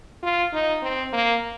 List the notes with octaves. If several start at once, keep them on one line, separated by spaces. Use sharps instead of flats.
F4
D#4
C4
A#3